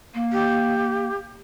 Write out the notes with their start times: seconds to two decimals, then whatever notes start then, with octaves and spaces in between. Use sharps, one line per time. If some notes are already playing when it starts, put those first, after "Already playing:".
0.14 A#3
0.32 G4